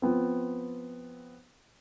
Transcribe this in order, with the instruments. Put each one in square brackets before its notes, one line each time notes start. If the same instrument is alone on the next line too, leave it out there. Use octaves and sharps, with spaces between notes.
[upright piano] F3 B3 C4